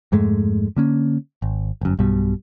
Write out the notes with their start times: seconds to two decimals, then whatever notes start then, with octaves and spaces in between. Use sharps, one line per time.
0.12 F2 G#2 G#3 A3
0.76 D3 A#3 C#4
1.42 G#1
1.81 G1 F#2
1.99 B1 G2 B2 G3